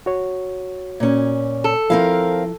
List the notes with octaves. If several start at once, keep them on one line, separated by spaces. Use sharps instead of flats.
F#4 C#5
A#2 C#4
A4
F3 C4 E4 A#4 F5